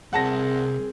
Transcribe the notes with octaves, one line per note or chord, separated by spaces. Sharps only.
C2 C4 G#4 A#4 F#5 A5 A#6